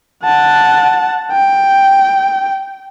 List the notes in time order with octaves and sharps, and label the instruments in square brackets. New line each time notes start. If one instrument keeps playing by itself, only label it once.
[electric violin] F#5 A5
G5